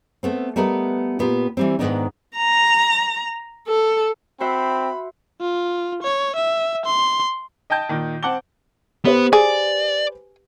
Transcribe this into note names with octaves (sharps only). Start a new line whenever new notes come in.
A3 B3 C4
G3 A3 B3 A#4 B4 D#5
A#2 B3 F4 G4
E3 G3 C4
G#2 C3 D#3 B3 D4 D#4
A#5
A4
C4 F#4 C5 E5 B5
F4
C#5
E5
C6
D#5 G5 A5 G6
A#2 D#3
C4 F#5 A5 D6 G7
B3 G4 B4 C5
G#4 D5